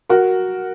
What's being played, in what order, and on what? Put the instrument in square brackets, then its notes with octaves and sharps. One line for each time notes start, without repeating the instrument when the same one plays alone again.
[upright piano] F#4 A#4